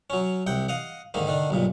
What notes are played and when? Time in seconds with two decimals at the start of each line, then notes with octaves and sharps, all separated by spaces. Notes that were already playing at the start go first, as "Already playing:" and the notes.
0.10 F#3 C#4
0.47 C2 F#5 G5
0.69 D#5 F5 F#5
1.14 G#2 D3 D#3 A#3
1.27 D3 D#3 D4
1.50 B1 G2 A#2